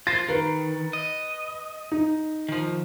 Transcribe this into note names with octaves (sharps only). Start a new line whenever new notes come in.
F4 C5 A6
D#3 B4
D#5
D#4
D#3 F3